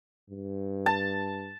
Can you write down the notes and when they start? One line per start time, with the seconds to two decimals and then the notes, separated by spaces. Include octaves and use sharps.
0.30 G2
0.86 A5